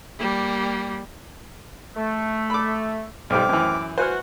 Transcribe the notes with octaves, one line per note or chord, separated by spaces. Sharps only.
G3 A#3
A3
B5 D6
B1 G3 C4 D6 F6
F#2 E3
E3 F#4 C5 F#5 G#5 F6